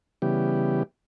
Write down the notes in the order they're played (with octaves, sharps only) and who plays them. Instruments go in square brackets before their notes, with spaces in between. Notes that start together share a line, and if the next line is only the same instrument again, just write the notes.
[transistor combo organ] C#3 E3 G3 B3 G4